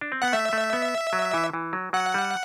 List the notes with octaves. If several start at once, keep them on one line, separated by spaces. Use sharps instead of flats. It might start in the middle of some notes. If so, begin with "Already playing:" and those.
D4
C4
B3 F#5
A3 E5
A3
B3
F#3
E3
E3
F#3
F#3 F#5
G3